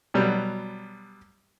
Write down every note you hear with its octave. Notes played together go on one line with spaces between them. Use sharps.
B2 F#3 G3